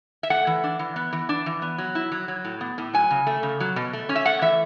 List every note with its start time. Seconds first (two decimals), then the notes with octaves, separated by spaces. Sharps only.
0.23 E5
0.30 A3 F#5
0.47 E3
0.64 D4
0.79 E3
0.96 B3
1.13 E3
1.29 D4
1.46 E3
1.62 B3
1.78 F#3
1.95 E4
2.12 F#3
2.28 F#3
2.45 A2
2.61 B3
2.78 A2
2.94 F#3 G#5
3.10 C#3
3.27 A3
3.43 C#3
3.60 F#3
3.76 B2
3.93 A3
4.09 C#4
4.16 E5
4.25 A3 F#5
4.42 E3 E5